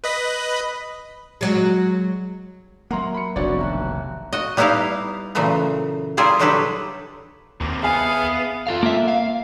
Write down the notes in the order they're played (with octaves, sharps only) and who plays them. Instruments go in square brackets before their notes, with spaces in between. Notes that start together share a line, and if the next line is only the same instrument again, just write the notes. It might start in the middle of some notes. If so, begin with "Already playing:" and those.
[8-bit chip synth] B4 D#5 B5
[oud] F#3 G#3
[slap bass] F#3 A#3 [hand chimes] A#4 E5 [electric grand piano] F#5 A#5 C6
[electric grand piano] B5 C#7
[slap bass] F1 B1 [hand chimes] D4 F5 C#6 [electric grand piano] F#4 C#5 D5
[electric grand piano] D#2 [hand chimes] E5 A#5 F#6
[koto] F#4 D#5
G3 B3 D#4 E4 G4 F5
A#2 C#3 E3 F#3 A3 B3
G3 E4 F4 G#4 A#4 C5
D3 F#3 F#4 G4 A4 B4
[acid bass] D#2 [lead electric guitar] C3 A#3
[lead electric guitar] B3 [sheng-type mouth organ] G#4 F5 [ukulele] E5 G#5 A5
[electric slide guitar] F4 A4 F5
[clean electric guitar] A#3 E5
[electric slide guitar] F5